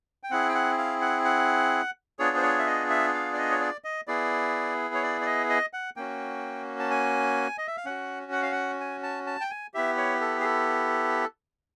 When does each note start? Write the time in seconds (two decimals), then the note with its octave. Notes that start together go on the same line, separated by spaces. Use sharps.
0.23 G5
0.31 C4 E4 G#4 F#5
0.49 G5
0.55 F#5
0.78 F5
1.01 F#5
1.25 F#5
2.19 B3 D4 F4 G#4 C#5
2.37 C5
2.42 C#5
2.58 E5
2.67 D#5
2.90 E5
3.14 F5
3.33 D5
3.38 D#5
3.51 C#5
3.61 D5
3.84 D#5
4.08 B3 E4 G#4 D5
4.94 C#5
5.03 D5
5.21 D5
5.26 D#5
5.49 D#5
5.73 F#5
5.97 A#3 C#4 F#4 G5
6.80 A5
6.91 G#5
7.58 D#5
7.67 E5
7.77 F5
7.85 C#4 F#4 F#5
8.32 F#5
8.42 F5
8.52 F#5
8.80 G#5
9.03 A5
9.27 A5
9.41 G5
9.50 G#5
9.74 B3 E4 G4 E5
9.97 C#5
10.21 A4
10.40 G#4
10.44 A4